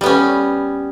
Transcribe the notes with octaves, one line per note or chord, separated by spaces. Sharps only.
G3 B3 C#4